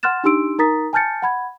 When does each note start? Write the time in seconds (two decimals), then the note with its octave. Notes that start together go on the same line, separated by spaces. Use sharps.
0.03 F#5 C6 F6 F#6 A6 E7
0.24 D4 D#4 G4 C6 E6 D7
0.59 D#4 A#4 A#5 D#6 A6 B6
0.93 G#5 A5 F6 G6 A6 C#7
1.22 F#5 B5 G#6